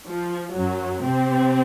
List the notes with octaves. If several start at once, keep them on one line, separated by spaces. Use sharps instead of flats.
F3
F#2 F#3
C3 C4